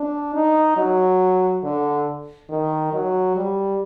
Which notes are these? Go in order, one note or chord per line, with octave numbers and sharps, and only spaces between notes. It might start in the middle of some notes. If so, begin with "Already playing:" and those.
Already playing: D4
D#4
F#3
D3
D#3
F#3
G3